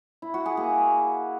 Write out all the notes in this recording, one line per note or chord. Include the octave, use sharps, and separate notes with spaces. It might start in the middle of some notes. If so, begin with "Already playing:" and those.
E4
F#4
G#4
A#3